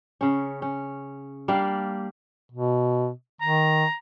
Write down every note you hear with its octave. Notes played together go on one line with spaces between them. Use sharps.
C#3 C#4
C#4
G3 A#3 D4 F5
B2
D#3 A#5